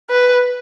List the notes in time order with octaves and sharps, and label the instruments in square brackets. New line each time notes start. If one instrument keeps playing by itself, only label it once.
[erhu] B4